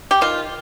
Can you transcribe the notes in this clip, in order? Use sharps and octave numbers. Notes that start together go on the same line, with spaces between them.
G4
D#3 F4